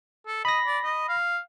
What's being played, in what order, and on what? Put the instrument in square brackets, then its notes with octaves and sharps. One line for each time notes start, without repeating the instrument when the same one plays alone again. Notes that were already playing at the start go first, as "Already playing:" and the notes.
[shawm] A4
[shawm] D#5 [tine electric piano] B5 A#6
[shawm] D5
D#5
F5